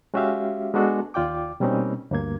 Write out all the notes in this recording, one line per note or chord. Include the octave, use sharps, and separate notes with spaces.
G#3 C#4 F#4 G4 E5 F5
G#3 B3 D4 F#4 A4
D#2 F4 D5 G5 D6
B2 G3 A#3 C4 C#4 D#4
D2 G2 A#3 G#6